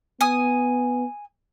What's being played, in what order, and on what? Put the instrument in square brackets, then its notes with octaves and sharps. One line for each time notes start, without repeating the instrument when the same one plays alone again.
[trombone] B3 [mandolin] G#5 D#6